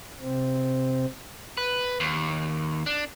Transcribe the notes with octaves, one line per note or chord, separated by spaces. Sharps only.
C3 C4
B4
D#2
D4